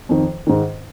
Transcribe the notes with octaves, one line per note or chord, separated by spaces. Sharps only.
F2 D#3
G#2 D#3